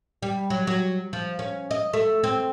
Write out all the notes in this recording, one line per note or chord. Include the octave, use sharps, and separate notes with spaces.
G3
F#3
F#3
F3
C#4
D#5
A3
C4